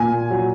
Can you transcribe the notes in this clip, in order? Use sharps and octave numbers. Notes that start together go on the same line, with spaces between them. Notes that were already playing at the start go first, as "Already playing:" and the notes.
Already playing: A#2 G#5
F#3